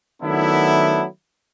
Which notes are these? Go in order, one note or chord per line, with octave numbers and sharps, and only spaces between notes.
D#3 F#3 A3 B3 D4 E4